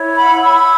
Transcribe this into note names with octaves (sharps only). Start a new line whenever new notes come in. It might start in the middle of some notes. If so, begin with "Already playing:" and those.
Already playing: E4 C#5
F#5 B5
B5 E6